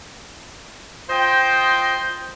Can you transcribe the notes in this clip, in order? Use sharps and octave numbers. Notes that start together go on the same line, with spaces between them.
F4 C5 D#5 G5